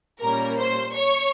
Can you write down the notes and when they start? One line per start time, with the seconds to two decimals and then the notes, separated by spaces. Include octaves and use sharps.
0.21 A#2 G3 A#3 C#4 A#4 A#5
0.59 C5 C6
0.94 C#5 C#6